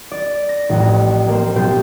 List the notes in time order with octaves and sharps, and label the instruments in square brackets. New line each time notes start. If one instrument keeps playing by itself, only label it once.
[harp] D5
A#6
A1 F2
A#3 C5
B1 B2 G4 C5 G6